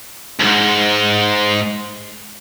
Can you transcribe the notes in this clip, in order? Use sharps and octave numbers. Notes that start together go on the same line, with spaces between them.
C2 G#2